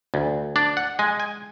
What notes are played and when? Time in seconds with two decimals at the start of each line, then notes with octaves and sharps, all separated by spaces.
0.14 D2
0.56 D4 D5
0.77 F#5
0.99 G#3 G#5
1.20 G#5